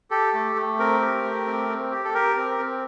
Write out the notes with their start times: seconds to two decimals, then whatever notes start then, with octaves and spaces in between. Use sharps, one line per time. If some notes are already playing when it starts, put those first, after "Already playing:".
0.11 G4 A4
0.34 A3
0.56 A3
0.79 C4 A#4
1.01 G4
1.24 A3
1.46 C4
1.69 C4
1.92 G4
2.05 A4
2.14 G4 A#4
2.36 C4
2.59 C4